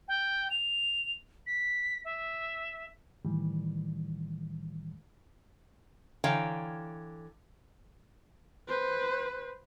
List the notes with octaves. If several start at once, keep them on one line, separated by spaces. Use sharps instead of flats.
G5
F7
B6
E5
A2 D#3 E3 G3
D3 E3 C#5 F5 G5 A#5
B4 C5